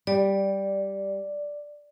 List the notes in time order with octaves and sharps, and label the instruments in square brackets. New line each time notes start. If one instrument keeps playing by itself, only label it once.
[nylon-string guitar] G3 [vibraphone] D5